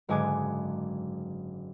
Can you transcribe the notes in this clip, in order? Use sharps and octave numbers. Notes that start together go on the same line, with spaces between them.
F#1 G#2 D3 G#3 G#5 D6